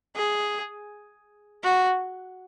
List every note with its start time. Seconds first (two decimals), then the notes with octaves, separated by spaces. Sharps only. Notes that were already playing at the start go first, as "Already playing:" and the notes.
0.16 G#4
1.63 F#4